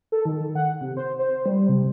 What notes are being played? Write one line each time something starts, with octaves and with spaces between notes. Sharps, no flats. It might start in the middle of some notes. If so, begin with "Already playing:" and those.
A4
D#3
F#5
C3
C5
C5
G3
C3